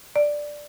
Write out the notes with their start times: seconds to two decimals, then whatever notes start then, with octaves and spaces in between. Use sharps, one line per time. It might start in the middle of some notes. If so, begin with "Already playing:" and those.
0.16 D5